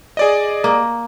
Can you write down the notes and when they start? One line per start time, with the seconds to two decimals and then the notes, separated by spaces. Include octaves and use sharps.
0.17 G#4 D5 D#5
0.64 A#3